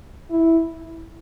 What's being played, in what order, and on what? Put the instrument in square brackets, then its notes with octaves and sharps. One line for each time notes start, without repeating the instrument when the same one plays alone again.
[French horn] E4